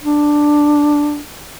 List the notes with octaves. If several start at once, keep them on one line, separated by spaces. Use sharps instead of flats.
D4